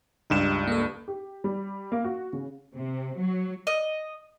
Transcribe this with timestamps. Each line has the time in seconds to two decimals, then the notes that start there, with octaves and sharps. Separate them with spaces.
0.30 C#2 G2 D#4 G4 E7
0.67 A#3 A4
1.08 G4
1.44 G3
1.92 A#3
2.04 F#4
2.33 C#3
2.74 C3
3.17 F#3
3.67 D#5